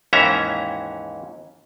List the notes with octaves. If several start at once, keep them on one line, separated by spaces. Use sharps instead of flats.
D#2 G#2 E3 C#4 E5 A#5